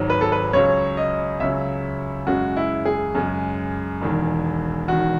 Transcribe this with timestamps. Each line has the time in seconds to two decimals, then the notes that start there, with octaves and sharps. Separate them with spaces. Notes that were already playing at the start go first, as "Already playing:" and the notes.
Already playing: G#1 G#2 F#3
0.10 B4
0.21 A4
0.32 B4
0.53 C#2 C#3 F#3 C#5
0.97 D#5
1.40 C#2 C#3 F#3 E5
2.27 F#2 C#3 G#3 F#4
2.57 E4
2.85 G#4
3.15 F#2 C#3 G#3
4.01 E1 E2 D#3
4.88 E1 E2 D#3 F#4